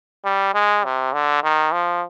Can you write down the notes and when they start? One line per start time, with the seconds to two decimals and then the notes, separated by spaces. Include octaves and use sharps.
0.25 G3
0.54 G#3
0.85 C3
1.13 D3
1.43 D#3
1.72 F3